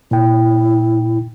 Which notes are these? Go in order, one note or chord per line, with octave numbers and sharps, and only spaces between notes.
A#2 E4 G5